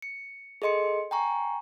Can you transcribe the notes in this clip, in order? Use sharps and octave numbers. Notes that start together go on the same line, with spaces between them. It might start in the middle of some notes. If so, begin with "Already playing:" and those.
C#7
G#4 A4 D#5 C6 C#7
G5 G#5 A#5 C#6